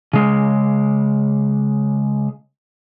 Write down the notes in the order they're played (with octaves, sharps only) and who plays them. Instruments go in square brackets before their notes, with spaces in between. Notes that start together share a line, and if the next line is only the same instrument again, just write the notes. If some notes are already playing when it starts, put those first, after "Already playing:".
[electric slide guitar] C#3 G#3